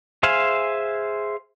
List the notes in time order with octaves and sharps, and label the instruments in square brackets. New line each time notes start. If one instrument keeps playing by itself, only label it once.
[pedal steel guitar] G#4 C5 E5 F5 G#5